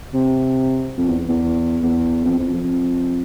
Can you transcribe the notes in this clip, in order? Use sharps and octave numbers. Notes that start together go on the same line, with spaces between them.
C3
F2
E2
E2
E2
F2
F2
F2